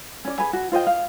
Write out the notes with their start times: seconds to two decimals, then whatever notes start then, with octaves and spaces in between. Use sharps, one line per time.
0.25 C#4 D5
0.38 G#4 B4 G#5
0.53 F#4
0.72 F4 C5 D#5 G5
0.87 F5